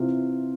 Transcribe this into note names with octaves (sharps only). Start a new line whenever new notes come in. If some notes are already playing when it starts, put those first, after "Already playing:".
Already playing: C3 E3 F4